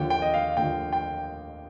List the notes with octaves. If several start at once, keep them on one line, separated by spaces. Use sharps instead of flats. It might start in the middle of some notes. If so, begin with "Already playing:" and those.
Already playing: D#2 D3 F3 G5
G5
D#5
F5
D#2 D3 F3 G5
G5